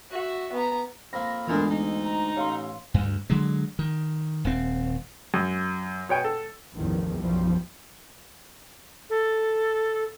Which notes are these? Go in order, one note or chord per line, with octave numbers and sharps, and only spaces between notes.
F#4 E5
B3 A#5
F2 A#3 B5 A#6
D2 A#2 E3 G#3 B3 D4 D#6
D#4
A#5
A1 C#5 F5 C6
D2 G2
D3 F#3 G#3
D#3
D#1 C4
F#2
B2 C#5 G5 G#5
A4
A1 E2 G2 D#3 F3
B1 F#2 F3 G3
A4